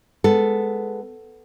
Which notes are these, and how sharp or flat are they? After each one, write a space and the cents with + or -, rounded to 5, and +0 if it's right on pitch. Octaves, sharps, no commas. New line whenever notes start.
G#3 +0 B3 +5 A4 +0